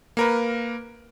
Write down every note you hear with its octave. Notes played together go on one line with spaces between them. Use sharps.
A#3 A#4 B4